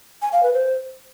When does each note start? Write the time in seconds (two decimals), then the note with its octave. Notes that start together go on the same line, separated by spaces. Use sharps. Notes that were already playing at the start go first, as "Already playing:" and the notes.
0.22 G#5
0.32 F5
0.43 B4
0.53 C5